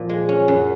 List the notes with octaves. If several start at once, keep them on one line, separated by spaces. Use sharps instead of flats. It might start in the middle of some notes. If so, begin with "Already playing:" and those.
Already playing: A#2 F3
G#3
C#4
F#2